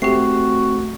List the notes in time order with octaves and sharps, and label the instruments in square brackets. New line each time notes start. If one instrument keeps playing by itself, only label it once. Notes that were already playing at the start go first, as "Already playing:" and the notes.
[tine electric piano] A3 C4 [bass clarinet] F#4 [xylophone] G4 C7